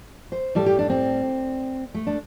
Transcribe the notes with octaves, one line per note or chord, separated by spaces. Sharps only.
C5
A2 G3 A4
G4
D4
C4
A3
D4